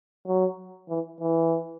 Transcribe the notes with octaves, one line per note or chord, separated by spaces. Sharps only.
F#3
E3
E3